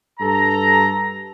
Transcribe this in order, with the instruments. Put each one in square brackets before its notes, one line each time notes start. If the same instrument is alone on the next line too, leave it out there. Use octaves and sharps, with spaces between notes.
[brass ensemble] G2 A4 A#5